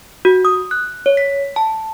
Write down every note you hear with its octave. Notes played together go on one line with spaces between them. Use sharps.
F#4
D#6
F#6
C#5
B6
A5